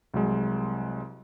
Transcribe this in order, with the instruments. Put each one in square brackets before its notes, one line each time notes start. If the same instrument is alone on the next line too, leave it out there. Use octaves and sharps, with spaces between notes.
[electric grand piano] C2 F#3 G#3